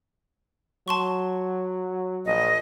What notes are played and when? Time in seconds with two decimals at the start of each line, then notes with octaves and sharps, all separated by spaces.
0.88 F#3 A5 C6 C#6
2.26 A#1 D#5